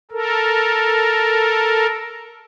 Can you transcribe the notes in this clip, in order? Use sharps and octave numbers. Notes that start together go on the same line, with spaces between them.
A4 A#4